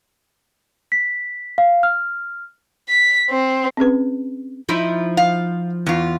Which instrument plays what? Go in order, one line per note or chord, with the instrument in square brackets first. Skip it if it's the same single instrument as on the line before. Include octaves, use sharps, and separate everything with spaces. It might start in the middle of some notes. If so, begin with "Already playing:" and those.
[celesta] B6
F5
F6
[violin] B6
C4
[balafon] C4 C#4 G#4 B4
[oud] F3 D#4 E4
[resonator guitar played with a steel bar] F5
E2 F4